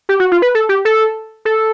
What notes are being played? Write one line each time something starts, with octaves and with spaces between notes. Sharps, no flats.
G4
F#4
F4
B4
A4
G4
A4
A4